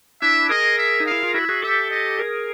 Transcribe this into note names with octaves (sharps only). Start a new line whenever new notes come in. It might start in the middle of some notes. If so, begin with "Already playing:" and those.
D4 E4 E5
G#4 A#4 D#5
E5
D#4
F5
E4
F4
E4 F#4 E5
F#4 G#4
G4 A4 E5
D#5
G#4 A#4